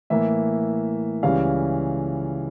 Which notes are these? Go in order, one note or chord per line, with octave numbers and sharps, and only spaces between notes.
A2 E3 A#3 E5
C#2 C#3 E3 G3 C#4 F5